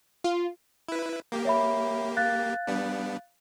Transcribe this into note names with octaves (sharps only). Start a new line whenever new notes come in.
F4
E4 B4
A#3 G4
C#5 E5 B5
F5 F#6 A6
G3 B3 D4